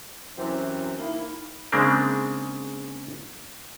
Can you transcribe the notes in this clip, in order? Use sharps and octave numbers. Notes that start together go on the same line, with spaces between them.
F#2 C3 E3
A#3 D#4 E4 B5
C#3 G#3 A#3 C4 D4